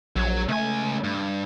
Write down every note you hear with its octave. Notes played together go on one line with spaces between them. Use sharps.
A#1 F#3 C#5
C#2 A3 G#5
G2